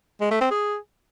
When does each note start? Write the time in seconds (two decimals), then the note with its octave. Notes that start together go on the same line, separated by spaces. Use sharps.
0.21 G#3
0.31 A3
0.41 C4
0.51 G#4